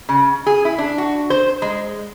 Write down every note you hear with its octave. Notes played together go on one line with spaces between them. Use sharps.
C#3
G#4
E4
D4
F#4
C5
G#3